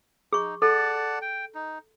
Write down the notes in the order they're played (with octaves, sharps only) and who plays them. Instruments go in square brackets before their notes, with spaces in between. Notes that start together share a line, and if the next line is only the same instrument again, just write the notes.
[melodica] D#4 [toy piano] G#4 C#6
[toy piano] A4 [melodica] D5 F#5 A5
[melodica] G5
D#4